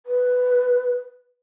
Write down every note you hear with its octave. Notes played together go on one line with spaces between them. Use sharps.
B4